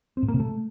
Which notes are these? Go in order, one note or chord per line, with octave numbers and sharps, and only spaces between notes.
C4
A2
A#3
C3
A3